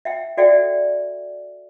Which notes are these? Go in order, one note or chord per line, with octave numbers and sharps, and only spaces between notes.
E5 F#5 G5
F#4 A4 D5 E5 F#5 G5